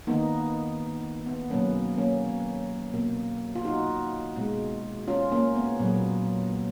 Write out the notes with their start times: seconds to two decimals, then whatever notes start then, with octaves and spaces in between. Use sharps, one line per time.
0.07 D#3 A#3 B3 D#4
1.26 B3
1.50 B2 F#3 A#3 C#4
1.98 A#3 C#4
2.93 B2 A#3
3.55 F4
3.65 D#4 F#4
4.36 B2 G#3
5.08 C#4 F4
5.31 A#3 C#4
5.56 B3
5.79 A#2 F#3 A#3